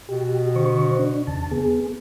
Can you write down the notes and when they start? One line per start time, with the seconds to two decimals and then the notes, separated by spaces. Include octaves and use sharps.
0.09 B2 G4
0.56 D3 C5 C#6
0.99 D4
1.27 E2 C#3 A5
1.51 B3 G#4